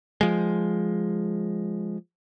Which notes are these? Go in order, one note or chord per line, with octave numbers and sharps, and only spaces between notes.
F3 G#3